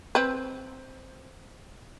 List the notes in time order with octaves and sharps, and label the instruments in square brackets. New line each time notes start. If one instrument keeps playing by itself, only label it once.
[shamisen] C4 B4